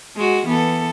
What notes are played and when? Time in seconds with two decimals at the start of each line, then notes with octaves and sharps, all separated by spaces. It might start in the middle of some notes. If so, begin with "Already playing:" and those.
0.16 G#3 F#4
0.46 E3 B3 A4